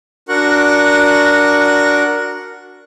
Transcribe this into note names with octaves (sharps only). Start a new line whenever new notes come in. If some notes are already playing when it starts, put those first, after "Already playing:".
D4 F#4 A#4 F#5 C#6 F#6